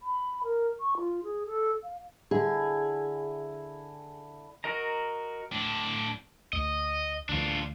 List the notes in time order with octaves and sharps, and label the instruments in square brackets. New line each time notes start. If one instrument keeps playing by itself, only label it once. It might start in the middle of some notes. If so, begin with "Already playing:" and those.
[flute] B5
A#4
C#6
F4
G#4
A4
F5
[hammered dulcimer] D3 E4 [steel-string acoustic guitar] G#4
[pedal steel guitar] F#4 A#4 D#5 A#5
[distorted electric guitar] A2 D4
[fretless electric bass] D2 [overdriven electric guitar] D#5
[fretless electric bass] D2 E3 [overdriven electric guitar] D4 F4